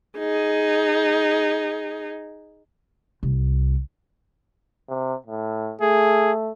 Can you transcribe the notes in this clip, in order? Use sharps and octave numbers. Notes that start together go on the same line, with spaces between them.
D#4 G#4
C2
C3
A2
A3 G#4